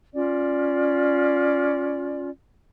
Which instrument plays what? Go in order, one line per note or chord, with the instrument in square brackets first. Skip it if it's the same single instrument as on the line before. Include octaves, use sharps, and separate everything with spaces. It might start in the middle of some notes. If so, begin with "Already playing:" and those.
[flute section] C#4 F4 D5